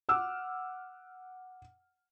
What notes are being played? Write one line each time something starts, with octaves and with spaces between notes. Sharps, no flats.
F#5 D6 E6 F6